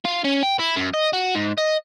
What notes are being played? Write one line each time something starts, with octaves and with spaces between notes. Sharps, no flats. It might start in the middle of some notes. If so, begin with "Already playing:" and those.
F4
C#4
G5
E4
F#2
D#5
F#4
G#2
D#5